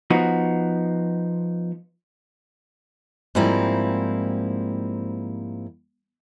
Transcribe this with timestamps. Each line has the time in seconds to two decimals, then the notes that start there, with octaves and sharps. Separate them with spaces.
0.10 F3 B3 D#4 F#4
3.35 G#2 F3 G3 A#3 C4 E4